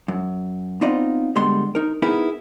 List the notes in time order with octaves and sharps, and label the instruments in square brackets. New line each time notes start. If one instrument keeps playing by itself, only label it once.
[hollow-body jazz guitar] F#2
B3 C4 D#4 F4 D5 D#5
D3 G3 G#3 B3 C6
D#4 A#4
B3 D#4 E4 G#4 A#4 B4